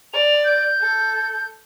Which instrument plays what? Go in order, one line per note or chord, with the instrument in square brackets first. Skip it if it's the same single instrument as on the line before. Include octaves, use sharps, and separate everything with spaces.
[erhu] D5 [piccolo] F7
[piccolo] G6
[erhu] A4